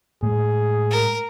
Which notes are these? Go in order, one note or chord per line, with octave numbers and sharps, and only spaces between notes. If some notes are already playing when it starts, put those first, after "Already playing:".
A2 G#3 G#4
A#4